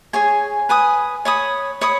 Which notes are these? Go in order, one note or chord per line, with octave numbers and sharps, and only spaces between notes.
G#4 C#5 G#5
B4 G#5 D#6
C#5 B5 D#6
C#5 B5 D#6